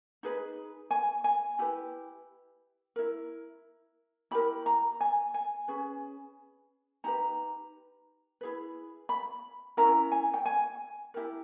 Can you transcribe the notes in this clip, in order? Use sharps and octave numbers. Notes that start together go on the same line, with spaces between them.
D#4 G#4 B4
G#5
G#5
E4 G4 B4
E4 A#4
E4 G4 A#4 B5
A#5
G#5
G#5
C#4 G#4 B4
D#4 G4 B4 A#5
E4 G#4 B4
B5
C#4 E4 A#4 A#5
G#5
G5
G#5
E4 G4 A#4